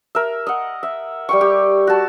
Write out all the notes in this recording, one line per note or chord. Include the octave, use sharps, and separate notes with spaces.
A#4 E5
D#5 F#5
E5
G3 G5 C#6
G4
F#4 A5